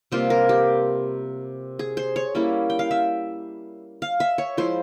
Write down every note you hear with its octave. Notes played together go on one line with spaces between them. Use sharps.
C3 G3 A#3 F4 C5
A#4
G4
G#4
C5
C#5
G3 A#3 C#4 E4
G5
F5
E5
F5
E5
C#5
F3 G#3 E4 C5